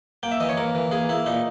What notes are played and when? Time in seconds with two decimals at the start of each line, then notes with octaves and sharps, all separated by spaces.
0.23 A#3 G5
0.32 E5
0.40 E3 D#5
0.49 C#5
0.57 A#3 A#4
0.75 E3
0.92 A#3 G#4
1.09 A#3 E4
1.26 A#2 D#4